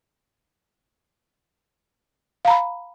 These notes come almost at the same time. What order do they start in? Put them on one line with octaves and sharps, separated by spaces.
F5 A#5 B5